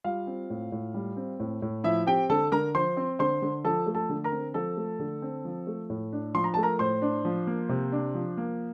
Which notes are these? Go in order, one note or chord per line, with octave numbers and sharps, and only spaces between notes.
G3 F4 F5
C4
A2
A2
G3
C4
A2
A2
F3 E4 E5
C4 G4 G5
D3 A4 A5
D3 A#4 A#5
F3 C5 C6
C4
D3 C5 C6
D3
F3 A4 A5
A3
A4 A5
D3
A#4 A#5
C4
F3 A4 A5
A3
D3
C4
F3
A3
A2
D4
F3 C6
A#5
A3 A5
A#4 A#5
A2 C5 C6
D4
F3
A#3
C3
D4
F3
A#3